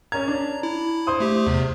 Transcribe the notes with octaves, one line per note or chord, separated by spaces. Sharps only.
C#4 A#4 A#5 G#6
D4
E4
C5 C6 D#6
A3 G4
E2 C3